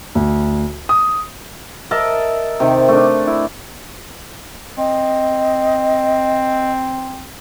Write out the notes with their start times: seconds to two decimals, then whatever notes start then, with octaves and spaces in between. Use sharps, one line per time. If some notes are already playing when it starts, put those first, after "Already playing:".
0.15 D2
0.89 D#6
1.91 A#4 D#5 E5 A5
2.60 C3 D#3
2.88 A3 D4
3.27 E4
4.78 C4 D#5